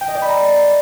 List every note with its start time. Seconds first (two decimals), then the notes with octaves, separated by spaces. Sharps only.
0.01 G5
0.08 D#5
0.15 D5
0.22 B5
0.29 A#5